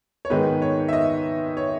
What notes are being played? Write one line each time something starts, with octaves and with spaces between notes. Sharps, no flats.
C#5
G#2 D#3 G#3 B3 D#4 B4
C#5
E5
D#5
C#5